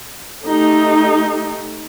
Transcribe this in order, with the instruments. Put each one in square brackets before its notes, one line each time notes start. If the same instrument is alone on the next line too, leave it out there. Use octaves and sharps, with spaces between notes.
[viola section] A3 D#4 G4